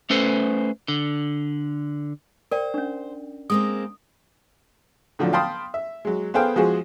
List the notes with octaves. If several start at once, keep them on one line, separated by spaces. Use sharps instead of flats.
A3 C#4 A4 B4 C5
D3
A#4 C5 D5 G5
C#4 D4
G#3 A#3 C4 D#6
A2 D3 F3 F#3
F5 G5 A5 B5 C6 D#6
E5
F#3 G#3
B3 G#4 A4 C5 F5 G5
F3 G#3 F#4 G#4 C5